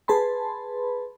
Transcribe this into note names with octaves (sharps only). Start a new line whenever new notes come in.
G#4 B4 A5 B5 C6